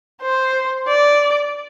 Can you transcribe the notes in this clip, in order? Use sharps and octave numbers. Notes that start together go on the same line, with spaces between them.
C5
D5